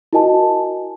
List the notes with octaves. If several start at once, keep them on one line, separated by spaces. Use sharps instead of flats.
E4 F#4 A#4 D#5 G#5 A5